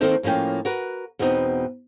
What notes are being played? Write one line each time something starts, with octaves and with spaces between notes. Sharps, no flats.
D#3 A#3 C4 D#4 A4 C5
A2 F3 A#3 C#4 G5
F#4 A#4 B4
E2 B2 B3 C4 D#4